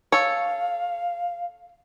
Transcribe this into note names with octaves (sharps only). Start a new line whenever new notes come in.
A4 C#5 F5